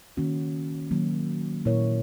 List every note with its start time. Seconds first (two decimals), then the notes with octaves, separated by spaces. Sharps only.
0.17 D#3 A#3 C#4 F#4
0.91 D#3 F#3 A#3
1.65 A#2 A#3 E4 A#4 C#5